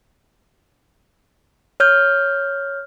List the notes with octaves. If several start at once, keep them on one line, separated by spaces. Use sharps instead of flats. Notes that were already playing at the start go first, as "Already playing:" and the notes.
C#5 F6 G6